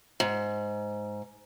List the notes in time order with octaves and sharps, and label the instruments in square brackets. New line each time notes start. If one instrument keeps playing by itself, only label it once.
[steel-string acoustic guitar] G#2